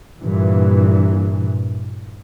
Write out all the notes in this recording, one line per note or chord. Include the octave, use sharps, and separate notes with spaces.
G2 A#2 E3